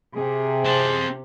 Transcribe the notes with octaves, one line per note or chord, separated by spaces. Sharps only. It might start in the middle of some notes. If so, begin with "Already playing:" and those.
C3 G#4
C4 C5 A5